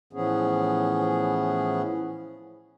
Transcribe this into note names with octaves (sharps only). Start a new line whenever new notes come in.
A2 E3 F3 B3 C#4 G#4